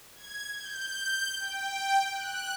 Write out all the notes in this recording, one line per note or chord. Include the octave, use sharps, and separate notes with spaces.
G#6
G6
G5
F#6